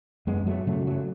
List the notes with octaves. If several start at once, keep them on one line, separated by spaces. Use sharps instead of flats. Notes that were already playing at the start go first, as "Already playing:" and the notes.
F#2 G#3 B3
F#3 A3
C#3 F#3 A3
F#3 A3